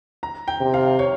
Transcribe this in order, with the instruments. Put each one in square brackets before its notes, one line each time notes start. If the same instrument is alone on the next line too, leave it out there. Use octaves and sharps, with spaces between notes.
[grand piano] A#5
G5
[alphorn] C3
[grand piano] F5
C#5